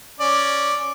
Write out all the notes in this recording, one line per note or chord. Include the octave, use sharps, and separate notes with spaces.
C#4 D5